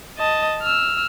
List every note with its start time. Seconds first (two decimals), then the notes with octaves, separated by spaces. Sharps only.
0.18 D#5 A5
0.63 E6 F6